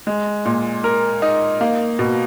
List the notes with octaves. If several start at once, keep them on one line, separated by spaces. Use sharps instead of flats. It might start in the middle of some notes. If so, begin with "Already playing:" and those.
G#3
A#2
A#4
D#4
A#3
B2